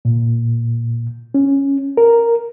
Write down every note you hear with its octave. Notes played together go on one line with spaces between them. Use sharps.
A#2
C#4
A#4